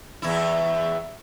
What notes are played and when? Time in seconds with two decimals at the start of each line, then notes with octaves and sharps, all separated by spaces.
0.22 E2 E4